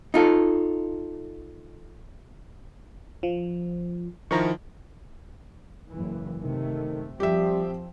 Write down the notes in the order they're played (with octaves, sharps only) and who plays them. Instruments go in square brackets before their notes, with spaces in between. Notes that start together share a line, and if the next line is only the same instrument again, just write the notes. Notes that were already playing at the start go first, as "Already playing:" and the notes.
[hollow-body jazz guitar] D#4 F4 A4
[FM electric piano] F3
[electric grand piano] D#3 F3 E4 [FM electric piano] A#5 C#6
[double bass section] F#1 E3
[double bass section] C3 A3 [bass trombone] D#3
[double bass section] F3 C4 [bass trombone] G3 [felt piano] G4 E5